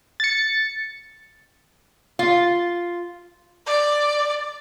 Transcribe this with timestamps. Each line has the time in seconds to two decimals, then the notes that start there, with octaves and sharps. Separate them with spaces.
0.20 A6 C#7
2.19 F4
3.66 D5